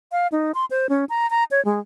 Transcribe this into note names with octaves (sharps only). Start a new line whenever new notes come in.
F5
D#4
C6
C5
C#4
A#5
A#5
C#5
G#3